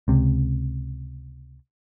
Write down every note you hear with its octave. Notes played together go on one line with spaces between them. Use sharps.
C#2 C3